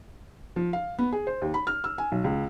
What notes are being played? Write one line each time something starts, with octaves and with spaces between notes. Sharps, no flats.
F3
F5
B3
G#4
C5
D#2
B5
F6
E6
G#5
B1
C#2